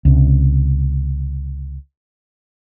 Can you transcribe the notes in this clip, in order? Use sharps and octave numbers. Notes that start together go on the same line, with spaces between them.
C#2 C3